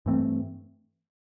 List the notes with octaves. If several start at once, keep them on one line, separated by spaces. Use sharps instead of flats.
G2 E3 A3 C4